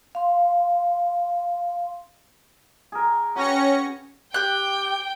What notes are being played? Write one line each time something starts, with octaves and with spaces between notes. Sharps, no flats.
F5 C6
G#4 A#4
C#4 F#4 B4 G5 A#6 C#7
G4 G5 F#6